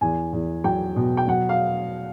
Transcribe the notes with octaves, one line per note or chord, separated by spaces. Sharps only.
E2 G#5
E2
F#3 G5
B2
G5
F#3 F#5
F5